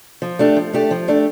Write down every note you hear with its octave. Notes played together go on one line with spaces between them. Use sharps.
F3
A3 D4 G4
F3
A3 D4 G4
F3
A3 D4 G4